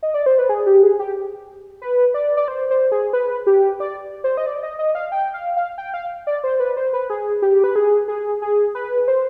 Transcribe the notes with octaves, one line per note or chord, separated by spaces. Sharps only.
D#5
D5
C5
B4
G#4
G4
G#4
G4
B4
D5
D5
C5
C5
G#4
B4
G4
D5
C5
D#5
D5
D#5
D#5
F5
G5
F5
F5
G5
F5
D5
C5
B4
C5
B4
G#4
G4
B4
G#4
G#4
G#4
B4
C5